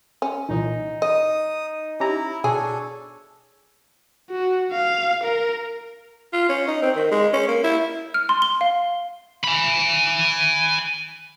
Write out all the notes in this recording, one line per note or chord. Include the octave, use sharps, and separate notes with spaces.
C#4
C2 A#2 E3 D#4
D#5 D#6
C#4 E4 G4 A#5
B2 D4 G#4 A4 C#5
F#4
F5
A#4
F4
C#4
D#4
C4
D#3
G#3
C#4
A#3
E4
F6
C6
G7
F5
G#5 B5